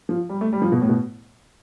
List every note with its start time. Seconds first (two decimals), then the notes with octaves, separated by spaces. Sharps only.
0.09 F3
0.29 G3
0.41 A3
0.53 G3
0.62 F3
0.72 B2
0.81 A2
0.89 B2